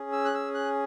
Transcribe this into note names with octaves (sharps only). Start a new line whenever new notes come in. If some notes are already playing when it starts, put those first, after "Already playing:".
Already playing: C#4 G#4
E6
F#6
E6
F#6